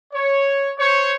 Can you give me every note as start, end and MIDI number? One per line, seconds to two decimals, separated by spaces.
0.14 0.70 73
0.79 1.14 72
0.79 1.14 73